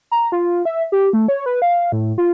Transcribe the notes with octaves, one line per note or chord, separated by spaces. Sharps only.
A#5
F4
E5
G4
A3
C#5
B4
F5
A2
F4